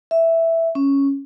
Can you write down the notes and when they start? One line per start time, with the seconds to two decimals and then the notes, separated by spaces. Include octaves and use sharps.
0.11 E5
0.75 C#4